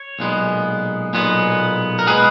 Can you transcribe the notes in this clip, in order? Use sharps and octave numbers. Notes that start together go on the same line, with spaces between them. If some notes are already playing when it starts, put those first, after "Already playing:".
Already playing: C#5
B1 A#2 G#3 B3
B1 A#2 G#3 B3
A#4
A#2 G#3 B3 G#4 B4